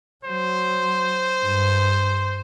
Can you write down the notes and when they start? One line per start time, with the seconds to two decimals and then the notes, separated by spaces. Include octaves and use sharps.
0.25 F#3 C5
1.41 G2